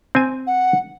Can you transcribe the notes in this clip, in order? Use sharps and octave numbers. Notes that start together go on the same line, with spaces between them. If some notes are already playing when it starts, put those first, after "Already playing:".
C4 G#5
F#5